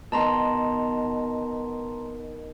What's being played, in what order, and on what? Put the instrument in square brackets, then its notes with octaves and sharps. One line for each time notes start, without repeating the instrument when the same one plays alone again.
[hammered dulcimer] B2 D#3 [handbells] A5 A#5 C6